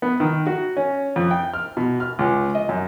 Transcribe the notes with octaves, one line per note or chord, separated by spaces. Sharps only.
B3
D#3
F#4
C#4
F2
G5
F6
B2
F6
C#2
D#5
F#2